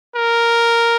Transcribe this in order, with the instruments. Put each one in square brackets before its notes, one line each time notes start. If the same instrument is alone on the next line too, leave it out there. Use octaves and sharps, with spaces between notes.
[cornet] A#4